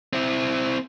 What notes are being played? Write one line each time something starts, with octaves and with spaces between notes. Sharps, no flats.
C4 E4